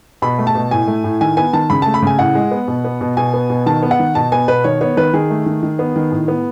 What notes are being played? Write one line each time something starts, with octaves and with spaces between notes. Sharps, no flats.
B2 B5
A3
A5
B2
A2 G#5
A3
A2
D#3 G#5
B3 G#5
D#3 A5
C#3 B5
A3 A5
B5
C#3 G#5
A2 F#5
G#3
B3
B2
B3
B2
B2 G#5
B3
B2
D#3 A5
B3
F#5
D#3
B2 A5
B3 G#5
B2 B4
D#3 C#5
B3 C#5
D#3 B4
D#3 G#4
A3
D#3
D#3
B3
D#3
A2
B3